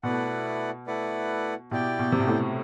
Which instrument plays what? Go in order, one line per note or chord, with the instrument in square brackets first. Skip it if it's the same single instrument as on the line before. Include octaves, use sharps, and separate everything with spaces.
[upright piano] B2 [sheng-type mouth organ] A3 E4 B4 D5 F#5
[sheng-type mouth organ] A3 E4 B4 D5 F#5
[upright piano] B2 [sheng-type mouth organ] E4 G4 D5 G5
[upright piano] B2
C3
B2
A2